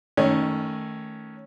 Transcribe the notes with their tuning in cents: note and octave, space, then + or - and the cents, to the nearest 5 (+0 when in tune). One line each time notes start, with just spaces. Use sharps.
D#3 +10 A3 +0 C#4 +0